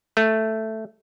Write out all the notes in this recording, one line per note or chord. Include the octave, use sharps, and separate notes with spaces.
A3